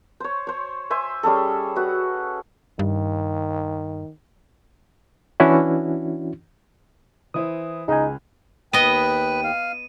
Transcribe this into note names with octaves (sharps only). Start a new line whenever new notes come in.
C5 C#5
C5 C#5
C5 E5 G#5 C6
G3 C#4 G#4 A4
F#4 B4
G2 D#3
E3 C#4 D4 E4 F#4
E3 E4 C5 D#6
C#2 D#4 G#4 G#5
D#2 B3 B4 D#5 G5 D#7
F5